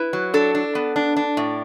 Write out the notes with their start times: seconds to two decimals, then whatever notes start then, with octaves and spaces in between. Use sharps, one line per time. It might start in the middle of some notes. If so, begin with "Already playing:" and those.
Already playing: E4 B4
0.13 F#3
0.34 D4 A4
0.55 D4
0.75 B3
0.96 D4
1.16 D4
1.37 A2